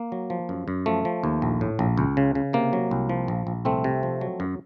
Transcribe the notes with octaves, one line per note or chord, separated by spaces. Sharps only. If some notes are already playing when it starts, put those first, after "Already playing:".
Already playing: A#3
F#3
F3
F#2
F#2
F3 A3
F3
D#2
A#1
A2
A#1
C#2
C#3
C#3
C3 A#3
F#3
C2
F3
A#1
A#1
C2 A3 C4
C3
F3
F#3
F#2